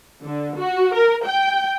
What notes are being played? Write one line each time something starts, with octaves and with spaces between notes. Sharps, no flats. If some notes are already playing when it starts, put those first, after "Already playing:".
D3
F#4
A#4
G5